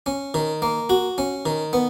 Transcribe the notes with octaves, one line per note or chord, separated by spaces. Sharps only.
C#4
D#3
A#3
F#4
C#4
D#3
B3